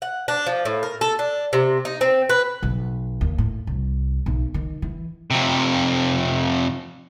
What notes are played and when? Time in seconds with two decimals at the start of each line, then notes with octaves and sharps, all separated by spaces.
0.02 F#5
0.28 D4
0.47 F3
0.65 A2
0.83 A#4
1.01 A4
1.19 D4
1.53 C3
1.85 D#4
2.01 C4
2.29 B4
2.63 B1
3.21 D#2
3.38 A2
3.67 C2
4.26 B1
4.54 D#3
4.82 E3
5.31 F2 C3